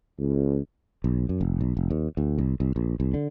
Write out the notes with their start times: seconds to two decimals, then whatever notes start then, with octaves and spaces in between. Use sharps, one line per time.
0.19 C#2
1.04 B1
1.29 F#2
1.41 F1
1.61 B1
1.77 F1
1.90 D#2
2.17 D2
2.38 C2
2.60 C2
2.76 A#1
3.00 C2
3.14 D3